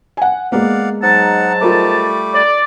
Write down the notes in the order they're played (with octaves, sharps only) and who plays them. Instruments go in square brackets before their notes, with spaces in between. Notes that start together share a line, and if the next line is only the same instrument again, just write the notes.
[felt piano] F#5 G#5
[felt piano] G#3 A#3 B3 [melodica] D5 F5 F#5
[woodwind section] G#2 F#3 A5 [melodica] D#4 F#5
[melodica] G3 A3 D6 [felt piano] F4 A#4
[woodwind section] D5